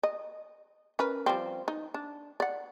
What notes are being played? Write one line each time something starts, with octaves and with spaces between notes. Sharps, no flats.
D#5
C#4 A#4 B4
F3 G3 C4
D#4
D4
D5 F#5